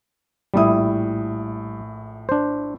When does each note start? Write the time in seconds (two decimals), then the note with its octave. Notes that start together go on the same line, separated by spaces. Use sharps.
0.54 A#1 A2 G3 E4 D#6
2.29 D4 C5